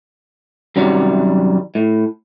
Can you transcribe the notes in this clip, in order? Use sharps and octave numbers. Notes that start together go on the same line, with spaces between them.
F#2 C3 D#3 F#3 G3
A2